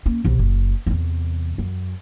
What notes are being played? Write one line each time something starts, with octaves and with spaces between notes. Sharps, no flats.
A#3 C#4
B1 C3
F#1
E2 C3
F#2